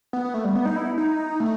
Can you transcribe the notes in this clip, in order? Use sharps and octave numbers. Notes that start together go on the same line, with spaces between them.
B3
B3
A3
G3
B3
D#4
E4
D#4
A3